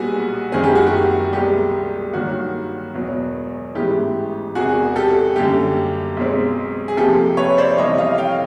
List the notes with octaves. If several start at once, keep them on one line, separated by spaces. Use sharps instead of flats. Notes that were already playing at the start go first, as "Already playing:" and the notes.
Already playing: B1 A#2 G3 B3 F#4 G#4
F#1 F#2 D#3 G#3 C4 G#4
G4
F#4
G4
C2 B2 G#3 B3 G4
G2 D#3 F#3 A#3 F#4
E1 E2 B2 F#3 B3
A1 G#2 E3 G#3 B3 G4
E1 E2 C3 F#4 G#4
G4 A4
F#2 D3 G3 A#3 G4
B1 B2 G#3 C4
G#4
F2 C3 F3 A#3 G4 A4
B4 C#5
C5 D5
F2 C3 E3 G3 B3 C#5 D#5
D#5 F5
F5 G5